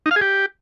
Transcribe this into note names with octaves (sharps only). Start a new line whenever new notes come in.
D#4
F5
G#4
G4